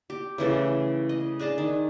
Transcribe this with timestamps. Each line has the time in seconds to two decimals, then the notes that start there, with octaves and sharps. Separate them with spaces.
0.10 G4
0.38 C#3 E3 A3 A4
1.09 D#5
1.39 D4 G#4 D#5 A5
1.58 D#3